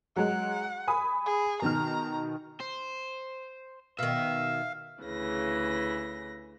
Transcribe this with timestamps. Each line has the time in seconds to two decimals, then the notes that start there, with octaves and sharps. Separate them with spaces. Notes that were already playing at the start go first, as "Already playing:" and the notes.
0.16 F#3 G#3 F#5
0.88 G#5 B5 D#6
1.26 G#4
1.62 B2 D#3 A#5 F6
2.60 C5
3.99 B2 D#3 E5 F5
5.02 D2 C#3 E3 A#6